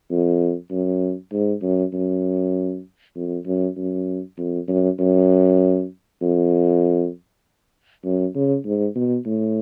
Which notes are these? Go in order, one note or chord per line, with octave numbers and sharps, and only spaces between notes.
F2
F#2
G#2
F#2
F#2
F2
F#2
F#2
F2
F#2
F#2
F2
F#2
C#3
G#2
B2
A2